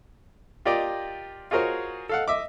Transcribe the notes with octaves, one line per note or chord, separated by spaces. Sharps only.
F4 G4 A#4 D5 D#5 G5
F4 F#4 G#4 A#4 C5 C#5
A4 F5 F#5
D#5 E5 D6